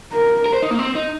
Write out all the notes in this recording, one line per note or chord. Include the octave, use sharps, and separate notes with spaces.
A#4
A#4
C5
D#4
A#3
C4
D#4